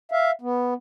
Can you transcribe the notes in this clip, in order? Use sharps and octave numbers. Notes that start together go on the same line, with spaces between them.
E5 F5
B3